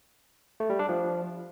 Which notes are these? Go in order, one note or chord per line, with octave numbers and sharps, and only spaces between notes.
A3
G3
D4
F3